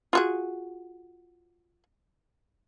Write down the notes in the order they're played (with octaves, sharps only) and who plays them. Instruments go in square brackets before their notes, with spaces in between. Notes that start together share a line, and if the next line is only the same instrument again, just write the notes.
[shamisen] F4 F#4 G#4